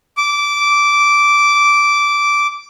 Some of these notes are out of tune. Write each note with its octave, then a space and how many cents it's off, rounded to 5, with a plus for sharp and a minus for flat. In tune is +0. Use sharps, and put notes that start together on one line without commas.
D6 -10